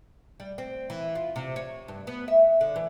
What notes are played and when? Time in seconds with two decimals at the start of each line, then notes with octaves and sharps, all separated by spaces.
0.40 G3
0.58 C4
0.90 E3
1.15 F4
1.36 C3
1.56 C#5
1.88 G2
2.07 B3
2.28 E5
2.61 D3
2.76 E3